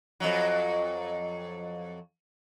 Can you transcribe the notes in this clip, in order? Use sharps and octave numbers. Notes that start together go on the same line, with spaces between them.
F2 G#2 F#3